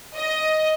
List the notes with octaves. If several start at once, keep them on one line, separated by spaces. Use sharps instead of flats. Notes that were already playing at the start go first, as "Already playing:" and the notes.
D#5